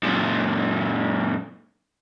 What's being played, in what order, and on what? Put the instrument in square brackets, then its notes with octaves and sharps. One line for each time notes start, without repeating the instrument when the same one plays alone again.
[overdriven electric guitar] F#2 A#2